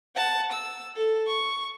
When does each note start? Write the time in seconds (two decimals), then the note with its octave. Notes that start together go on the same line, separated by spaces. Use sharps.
0.16 F#5 A5
0.52 E6
0.96 A4
1.27 C#6